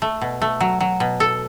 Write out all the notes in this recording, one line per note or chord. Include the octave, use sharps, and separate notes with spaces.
A3
B2
A3
F#3
F#3
B2
A4